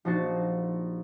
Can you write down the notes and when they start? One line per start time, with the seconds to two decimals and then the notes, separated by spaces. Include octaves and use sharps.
0.05 A#1 F3 D#4 F#4 A6 C7